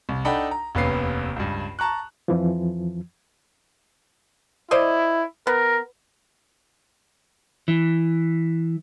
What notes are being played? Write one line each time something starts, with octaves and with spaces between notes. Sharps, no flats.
C2
D4 D#4 A4 F#5 G5 B5
A#5
F1 D#2 B3 C#4 B4 C7
C#2 G2
A5 A#5 C#6 F#6
F2 E3 F3
E4 C5 D5 D#5
B3 A#4
E3